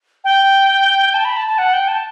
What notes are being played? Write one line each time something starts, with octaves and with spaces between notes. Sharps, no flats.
G5
A5
B5
A5
A5
F#5
G5
A5